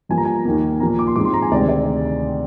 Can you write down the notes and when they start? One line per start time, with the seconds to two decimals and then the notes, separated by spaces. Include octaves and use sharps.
0.09 G2 F3 A#3 G#5
0.18 A#5
0.25 G#5
0.45 D#2 D#3 A#3
0.80 A#2 F3 A#3 A#5
0.99 D6
1.07 C6
1.16 G#2 F3 G#3 C4 D6
1.25 C6
1.34 A#5
1.42 G#5
1.51 D2 C3 D#3 G#3 C4 D5
1.69 D5